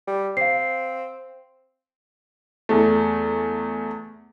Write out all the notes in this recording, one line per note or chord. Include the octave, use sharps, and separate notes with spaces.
G3
C4 F5 C7
E2 A3